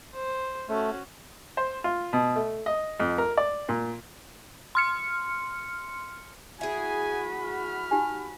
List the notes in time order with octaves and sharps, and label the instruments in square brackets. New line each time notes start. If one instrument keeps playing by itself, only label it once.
[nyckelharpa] C5
[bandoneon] A3 [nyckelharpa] C#4 F#4
[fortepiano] C5
F4
B2
A3
D#5
F2
A#4
D5
A#2
[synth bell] C6 F6 C#7
[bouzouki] E4 G#4 [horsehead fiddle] F#4 B5 [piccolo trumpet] G#5
[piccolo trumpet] F6
[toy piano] D#4 G4 G#5